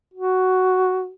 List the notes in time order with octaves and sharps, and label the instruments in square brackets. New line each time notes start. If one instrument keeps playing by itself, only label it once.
[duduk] F#4